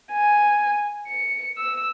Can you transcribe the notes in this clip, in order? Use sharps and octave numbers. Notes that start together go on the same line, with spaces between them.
G#5
C#7
E6